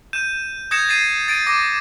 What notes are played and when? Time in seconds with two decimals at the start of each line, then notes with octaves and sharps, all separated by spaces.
0.13 G6 D#7 E7
0.71 D#6 G6 G#6 A#6 C#7 E7
0.89 A6 C7 D#7 E7
1.28 A6 D7 D#7
1.47 D6 A#6 D#7